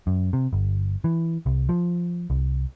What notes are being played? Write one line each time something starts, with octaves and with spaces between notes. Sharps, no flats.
F#2
C3
G1
E3
C2
F3
C2